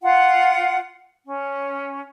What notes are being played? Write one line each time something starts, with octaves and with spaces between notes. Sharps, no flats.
F4 F#5
C#4